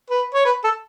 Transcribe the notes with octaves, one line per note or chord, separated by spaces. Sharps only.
B4
C#5
B4
A4